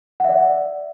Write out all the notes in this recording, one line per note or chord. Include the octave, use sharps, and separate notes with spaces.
D5 E5 F#5